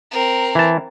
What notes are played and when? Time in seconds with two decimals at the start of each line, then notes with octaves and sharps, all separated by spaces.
0.11 C4 A#4
0.55 E3 A5